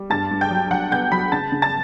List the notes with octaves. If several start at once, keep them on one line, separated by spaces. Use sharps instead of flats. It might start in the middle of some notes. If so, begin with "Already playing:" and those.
Already playing: G3
G2 A5 A6
G2
G5 G6
F#3
F#3 F#5 F#6
B3 G5 G6
F#3 B5 B6
C#3 A5 A6
C#3
A5 A6